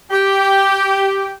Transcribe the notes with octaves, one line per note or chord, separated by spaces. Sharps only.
G4